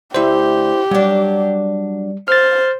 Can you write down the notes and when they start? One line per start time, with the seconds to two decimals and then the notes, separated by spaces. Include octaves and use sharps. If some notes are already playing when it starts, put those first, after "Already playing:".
0.14 D2 E4 G4 C5 E5
0.91 F#3 G3 D4
2.28 C5 F6 A6